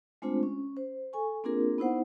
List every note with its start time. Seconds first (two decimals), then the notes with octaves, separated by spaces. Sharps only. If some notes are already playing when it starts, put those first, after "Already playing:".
0.22 G#3 A3 C4 D4 F4 C5
0.43 C#4
0.77 C5
1.13 A4 G#5 C#6
1.44 A#3 C4 D4 F4 G#4 A#4
1.78 B3 D#4 E4 C5 F#5